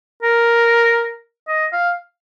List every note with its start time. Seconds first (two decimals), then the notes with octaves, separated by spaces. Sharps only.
0.23 A#4
1.48 D#5
1.73 F5